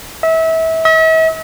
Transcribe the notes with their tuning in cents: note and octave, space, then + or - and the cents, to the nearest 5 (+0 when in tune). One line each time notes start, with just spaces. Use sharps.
E5 -30
E5 -45